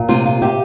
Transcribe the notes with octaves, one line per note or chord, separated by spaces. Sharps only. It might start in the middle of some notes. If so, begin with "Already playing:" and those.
Already playing: A#2
C3 F4
F4
C3 G4